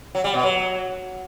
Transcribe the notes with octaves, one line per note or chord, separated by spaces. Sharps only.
F#3
G3
B2
F#3